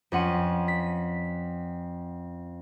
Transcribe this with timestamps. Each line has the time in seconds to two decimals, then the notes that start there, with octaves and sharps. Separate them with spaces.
0.12 F2 C#4 F#5 C6 D#7
0.68 B6